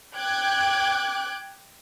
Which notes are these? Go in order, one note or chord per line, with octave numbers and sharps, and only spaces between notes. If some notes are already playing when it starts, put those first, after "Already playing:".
G5 D6 F#6 G#6